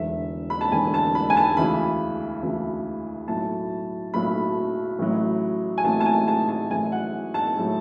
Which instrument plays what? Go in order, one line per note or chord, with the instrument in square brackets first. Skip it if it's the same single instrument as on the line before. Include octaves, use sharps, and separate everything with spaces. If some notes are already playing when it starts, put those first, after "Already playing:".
Already playing: [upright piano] E1 E2 D3 E5
B5
A5
E1 E2 D3 G#5
A5
B5
G#5
A5
D2 C#3 E3 B5
D2 C#3 E3
B1 A2 F#3 A5
B1 A2 F#3 B5
A1 A2 F#3
G#5
A1 A2 F#3 A5
A5
G#5
A5
A5
A1 A2 F#3 G#5
F#5
A5
A2 F#3